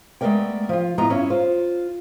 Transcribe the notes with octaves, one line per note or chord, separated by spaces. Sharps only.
G#3 A3 B3 A#4 D5 G5
F3 F4
A2 B3 F4 D#5 A#5
G2 C#4 E4
F4 C5